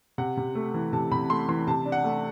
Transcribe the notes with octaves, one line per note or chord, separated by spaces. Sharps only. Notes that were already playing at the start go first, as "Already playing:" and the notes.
C3 F#5
C3
A3
E3
C3 A5
C3 B5
A3 C6
E3 C6
C3 A5
D4
F#5
A3